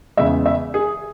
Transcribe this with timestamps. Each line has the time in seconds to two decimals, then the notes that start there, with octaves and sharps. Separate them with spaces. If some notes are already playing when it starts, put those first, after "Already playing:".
0.17 E2 C#3 G#3 E5
0.46 E5
0.74 G#4